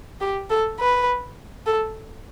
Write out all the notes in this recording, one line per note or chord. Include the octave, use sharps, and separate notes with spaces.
G4
A4
B4
A4